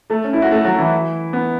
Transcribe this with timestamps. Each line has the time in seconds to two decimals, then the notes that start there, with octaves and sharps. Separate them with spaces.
0.10 A3 A4
0.24 C#4
0.33 E4
0.42 F#4
0.51 A3 A4
0.64 F#3 F#4
0.78 E3 E4
1.33 B3